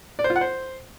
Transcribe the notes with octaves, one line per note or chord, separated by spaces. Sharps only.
D5
C5
F4
F#5
C5